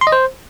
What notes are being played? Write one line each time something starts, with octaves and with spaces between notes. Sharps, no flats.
C6
D#5
C5